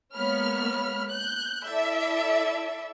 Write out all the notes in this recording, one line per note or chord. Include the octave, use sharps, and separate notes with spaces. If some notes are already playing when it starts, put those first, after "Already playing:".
G#3 A#3 B3 C#5 B5 F6
F#6 G6
E4 A4 D5 E5